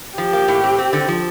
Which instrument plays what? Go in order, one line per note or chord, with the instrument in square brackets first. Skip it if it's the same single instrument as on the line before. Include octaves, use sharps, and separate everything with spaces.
[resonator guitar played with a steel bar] F3 [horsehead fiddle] G4
[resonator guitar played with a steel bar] A#3
A2
C4
C4
D3
F3